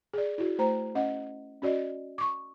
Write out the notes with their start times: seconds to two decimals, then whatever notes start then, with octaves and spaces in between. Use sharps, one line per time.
0.13 G#4 D5
0.38 E4 F#4
0.59 A3 C5 A#5
0.95 C#4 D#5 F#5
1.62 C#4 F#4 D5 D#5
2.18 C#6 D6